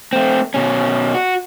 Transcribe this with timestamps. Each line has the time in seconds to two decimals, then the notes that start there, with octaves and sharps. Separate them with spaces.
0.13 A3 C4
0.54 B2 C#4
1.15 F#4